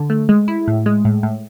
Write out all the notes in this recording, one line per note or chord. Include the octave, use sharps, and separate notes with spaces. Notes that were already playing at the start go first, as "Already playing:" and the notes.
Already playing: D3
A3
G#3
E4
A2
G#3
A2
A2